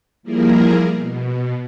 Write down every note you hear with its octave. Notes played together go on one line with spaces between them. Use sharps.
F3 G3 A#3 E4 G#4 A#4
B2